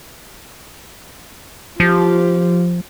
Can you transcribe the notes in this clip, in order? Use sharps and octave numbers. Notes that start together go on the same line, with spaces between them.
F3 F4 G4